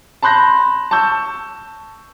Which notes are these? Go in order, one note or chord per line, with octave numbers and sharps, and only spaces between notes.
A5 B5 C6 F#6 G6 A#6
A5 C#6 E6 G6